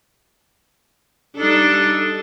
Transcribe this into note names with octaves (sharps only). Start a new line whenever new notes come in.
G3 D4 D#4 A4